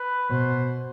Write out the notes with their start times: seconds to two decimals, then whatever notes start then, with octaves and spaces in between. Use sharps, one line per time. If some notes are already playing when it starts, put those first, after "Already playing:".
Already playing: B4
0.29 B2 C5